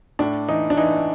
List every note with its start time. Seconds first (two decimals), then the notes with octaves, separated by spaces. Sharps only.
0.19 A2 D4
0.49 E3 D#4
0.70 D4
0.77 E3 D#4